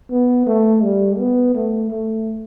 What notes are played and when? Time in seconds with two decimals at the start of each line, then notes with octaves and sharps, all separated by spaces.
0.10 B3
0.46 A3
0.83 G3
1.18 B3
1.55 A3
1.90 A3